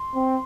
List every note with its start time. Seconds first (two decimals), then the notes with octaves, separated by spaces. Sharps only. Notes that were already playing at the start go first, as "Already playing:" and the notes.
Already playing: C6
0.15 C4